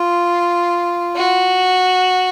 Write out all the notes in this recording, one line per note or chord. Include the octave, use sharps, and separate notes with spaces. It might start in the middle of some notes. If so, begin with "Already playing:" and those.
Already playing: F4
F#4